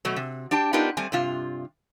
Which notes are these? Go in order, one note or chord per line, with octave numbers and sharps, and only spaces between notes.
B2 F#3 A3
C3
D4 G4 G5 A5
B3 D4 D#4 F4 G4 A#4
G3 A3 C4 G#5
G2 C3 F4